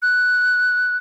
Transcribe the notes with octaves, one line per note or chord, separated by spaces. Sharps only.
F#6